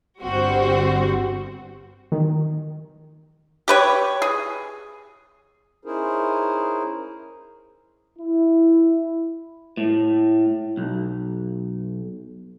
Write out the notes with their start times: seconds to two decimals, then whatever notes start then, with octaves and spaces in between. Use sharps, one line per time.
0.22 G1 G3 C4 F#4 C5
2.12 D#3
3.68 G4 B4 C#5
4.22 G#4
5.85 C#4 D#4 E4 G#4 A#4 C5
8.18 E4
9.77 A2
10.77 B1